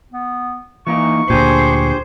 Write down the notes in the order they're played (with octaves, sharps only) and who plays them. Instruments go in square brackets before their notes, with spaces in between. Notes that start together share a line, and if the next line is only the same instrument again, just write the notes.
[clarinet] B3
[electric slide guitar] E3 A#3 D#4 [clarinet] C#6
[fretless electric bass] D2 A#2 [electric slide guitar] D4 G4 G#4 [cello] C5